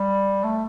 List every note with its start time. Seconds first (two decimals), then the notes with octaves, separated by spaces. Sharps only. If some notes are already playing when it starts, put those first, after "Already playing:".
Already playing: G3
0.44 A3